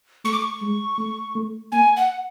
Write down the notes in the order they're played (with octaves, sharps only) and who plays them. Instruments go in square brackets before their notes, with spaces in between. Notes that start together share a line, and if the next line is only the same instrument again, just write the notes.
[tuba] A3 [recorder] C#6
[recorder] D6
C#6
[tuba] G#3
A3
A3
[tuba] A#3 [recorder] G#5
[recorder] F#5